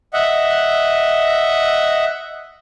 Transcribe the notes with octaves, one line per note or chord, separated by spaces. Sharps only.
D#5 E5 F#5